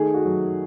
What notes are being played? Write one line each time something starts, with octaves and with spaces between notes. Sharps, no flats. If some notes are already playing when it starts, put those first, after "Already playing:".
Already playing: D#3 A3 G#4
F#4
F#3